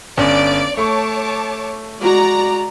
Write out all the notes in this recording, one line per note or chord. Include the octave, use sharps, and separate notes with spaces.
G1 C#4 D5 D7
A3 C#5 A5 C#6 D6
G#3 F#4 D5 A#5